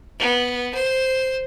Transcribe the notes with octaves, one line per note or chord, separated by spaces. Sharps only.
B3
C5